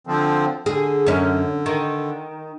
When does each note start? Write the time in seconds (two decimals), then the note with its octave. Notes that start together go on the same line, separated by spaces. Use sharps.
0.07 D3 F3 C4
0.66 D3 G#4
1.06 F#2 C#4
1.66 D#3